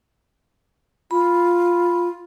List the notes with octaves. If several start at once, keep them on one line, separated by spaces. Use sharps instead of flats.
F4 B5